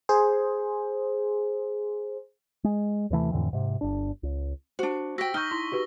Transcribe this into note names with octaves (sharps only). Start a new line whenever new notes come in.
G#4 C5
G#3
D#2 C3 E3 A3
F2 A2 D3 E3
G#2 C3
G1 D4
C#2
D4 F#4 C5
F#4 G5 E6 A#6 B6
D#4 C#6 F6 G6 G7
E4 C6
F#4 G4 B4